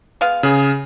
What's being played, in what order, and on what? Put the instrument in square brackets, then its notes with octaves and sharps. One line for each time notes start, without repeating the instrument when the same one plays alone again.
[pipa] G#3 B3 F5
[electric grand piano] C#3 G#4